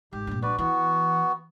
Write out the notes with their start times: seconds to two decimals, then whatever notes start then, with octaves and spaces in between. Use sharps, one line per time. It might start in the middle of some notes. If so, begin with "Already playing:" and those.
0.13 G#1 G4
0.27 G2 A#2
0.42 A#1 F#4 B4 D5
0.58 E3 B3 F#4